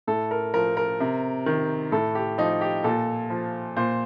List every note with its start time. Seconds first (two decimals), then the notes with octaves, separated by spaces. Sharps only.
0.07 A2 A4
0.31 A#4
0.54 F3 A#4
0.77 A#4
1.00 C3
1.46 D#3
1.92 A2 A4
2.15 G4
2.38 F3 D#4
2.61 G4
2.84 A#2 A4
3.30 F3
3.76 A#2 C5